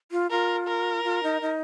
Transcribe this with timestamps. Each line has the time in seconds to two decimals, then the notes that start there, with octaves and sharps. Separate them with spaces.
0.11 F4
0.30 F4 A#4
0.67 A#4
1.04 F4
1.23 D#4
1.42 D#4